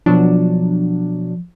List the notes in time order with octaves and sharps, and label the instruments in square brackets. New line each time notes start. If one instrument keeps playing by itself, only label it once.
[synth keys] B2 F#3 D4 [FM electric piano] F3